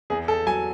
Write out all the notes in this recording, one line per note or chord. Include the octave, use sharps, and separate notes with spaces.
E2 G#4
A4
F#3 G#5